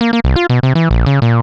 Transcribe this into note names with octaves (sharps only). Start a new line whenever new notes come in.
A#3
A#3
C2
F4
B2
C3
E3
A#1
C#3
A#2